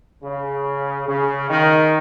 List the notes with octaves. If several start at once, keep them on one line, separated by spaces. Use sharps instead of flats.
C#3
C#3
D#3